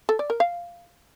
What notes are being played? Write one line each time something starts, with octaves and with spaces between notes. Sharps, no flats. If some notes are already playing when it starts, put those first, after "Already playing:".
A4
D5
A#4
F5